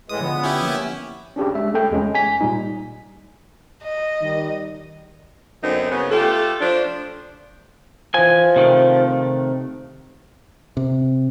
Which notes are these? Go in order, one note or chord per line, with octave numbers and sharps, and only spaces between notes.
A2 E3 G#3 D#6
D3 F3 B3
C#4 E4 G4
A#3 E5
C#4 D4 G4 G#4
G#3 E5
A3 A4 G5
E2 G#3 C#4
G#5 B6
A#2 G3 D#4
D#5
D#3 G3
F#2 D3 B3 C4 D#4
C#3 B3
A3 F4 G4 A4
F3 A3 D4
E3 F3 G#5
C3 D#3 A3
C3